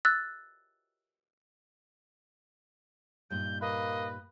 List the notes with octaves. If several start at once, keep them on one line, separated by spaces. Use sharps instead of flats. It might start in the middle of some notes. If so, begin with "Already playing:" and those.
E6 F#6 A6
G2 A#2 D#4 G6
A#3 B4 D#5